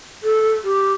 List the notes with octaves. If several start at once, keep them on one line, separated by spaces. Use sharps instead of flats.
A4
G4